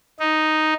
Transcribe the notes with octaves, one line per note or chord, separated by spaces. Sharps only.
D#4